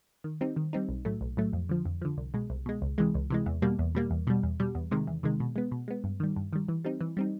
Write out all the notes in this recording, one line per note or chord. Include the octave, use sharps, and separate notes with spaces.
D#3
G3 C4 D#4
D#3
G3 C4 D#4
B1
A2 F#3 A3
B1
A2 F#3 A3
F2
D3 F3
F2
D3 F3
C2
B2 G#3
C2
B2 G#3
C#2
C3 E3 G#3
C#2
C3 E3 G#3
E2
B2 G3 A#3
E2
B2 G3 A#3
E2
B2 G3
E2
B2 G3
E2
C3 D#3 G#3
E2
C3 D#3 G#3
B2
G#3 B3
B2
G#3 B3
G2
D#3 G3
G2
D#3 G3
E3
G3 C4 D#4
E3
G3 C4 D#4